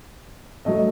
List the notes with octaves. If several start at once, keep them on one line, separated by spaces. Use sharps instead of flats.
F#3 A3 D#5